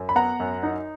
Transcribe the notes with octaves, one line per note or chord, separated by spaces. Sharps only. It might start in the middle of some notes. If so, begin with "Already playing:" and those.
Already playing: F#2
B5
B3 F#5 A#5
F#2
D#4